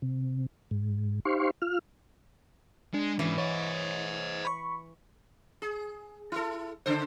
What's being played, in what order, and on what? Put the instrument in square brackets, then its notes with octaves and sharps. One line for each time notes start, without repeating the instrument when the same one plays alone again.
[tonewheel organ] C3
G#2
D#4 G4 C5 F5 C6 C#6
F4 F6
[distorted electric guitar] G#3 [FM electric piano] D4
[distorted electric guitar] G#2 C#4 [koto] E3
[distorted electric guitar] C5 D#5 [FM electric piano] C#5
[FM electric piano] B5 C#6
[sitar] G#4
E4 A4
C#3 A4 C5